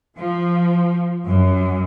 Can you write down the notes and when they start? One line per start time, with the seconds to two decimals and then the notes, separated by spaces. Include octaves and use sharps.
0.19 F3
1.29 F#2